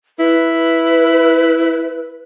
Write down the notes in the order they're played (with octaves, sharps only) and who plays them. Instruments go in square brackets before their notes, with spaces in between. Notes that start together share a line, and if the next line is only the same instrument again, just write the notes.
[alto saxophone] E4 [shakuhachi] B4